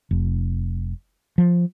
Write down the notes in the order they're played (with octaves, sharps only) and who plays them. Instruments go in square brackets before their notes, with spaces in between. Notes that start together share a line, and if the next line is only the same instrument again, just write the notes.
[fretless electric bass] F1
F3